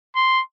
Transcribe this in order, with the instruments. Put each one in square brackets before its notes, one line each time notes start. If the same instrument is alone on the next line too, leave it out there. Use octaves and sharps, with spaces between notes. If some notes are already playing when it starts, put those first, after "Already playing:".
[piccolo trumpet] C6